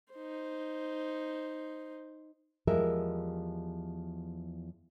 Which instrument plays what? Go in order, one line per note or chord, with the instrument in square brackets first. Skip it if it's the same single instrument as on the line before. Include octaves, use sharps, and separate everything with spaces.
[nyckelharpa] D#4 C5
[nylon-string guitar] E2 F3 G3 G#3 A#4 E5